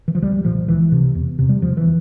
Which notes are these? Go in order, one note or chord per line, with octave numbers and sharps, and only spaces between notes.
E3
F3
C2 G3
A#2 F3
C#2 E3
C3
E2
C3
G3
E2 F3
E3